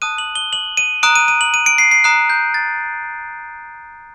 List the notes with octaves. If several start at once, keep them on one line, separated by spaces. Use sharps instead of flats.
A5 D#6 F#6 D#7
F#7
G7
F#7
D#7
A#5 D#6 F#6 D7
D#7
D#7
F#7
D#7
D7
C7
C7
A#5 D#6 F#6 C7
G6
A6